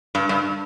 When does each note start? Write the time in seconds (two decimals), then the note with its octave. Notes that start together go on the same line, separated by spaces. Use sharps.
0.15 G2
0.29 G2